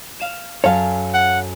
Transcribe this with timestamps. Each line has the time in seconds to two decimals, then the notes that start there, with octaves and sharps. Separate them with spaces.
0.20 F5 E7
0.64 F#2 A4 C#5 F5
1.14 F#5